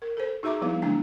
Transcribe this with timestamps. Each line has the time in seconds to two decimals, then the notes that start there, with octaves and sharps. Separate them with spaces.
0.02 A#4
0.17 A4 C5
0.43 D#4 F#4 G#4 E5 A#5 D6
0.62 F3 G3 B3 E4 B4 F5
0.82 D3 F#3 A3 B3 D4 A#5